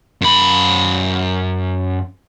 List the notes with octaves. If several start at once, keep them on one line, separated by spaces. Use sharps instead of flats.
F#2 B5